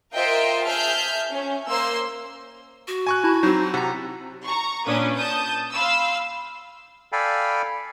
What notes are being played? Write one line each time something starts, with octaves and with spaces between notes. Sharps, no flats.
F4 A#4 C5 D#5 E5 G5
G#4 E5 A5 F6 G6
C#4
A#3 C5 C6 E6
F#4
G#5 C#6 F#6
E4 A5 B5
F#3 C4 D#4
C3 F#5 A#5
A#5 C#6
A#2 C#4 D4 B4 D#6
A5 D#6 G6
F5 B5 C6 E6
A4 D5 F5 G5 G#5 B5